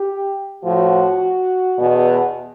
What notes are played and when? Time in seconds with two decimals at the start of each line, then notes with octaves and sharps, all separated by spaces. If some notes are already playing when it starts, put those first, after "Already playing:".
Already playing: G4
0.64 A2 F3 F#4
1.78 E2 B2